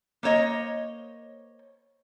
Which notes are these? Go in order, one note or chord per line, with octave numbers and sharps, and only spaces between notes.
A#3 C5 C#5 D#5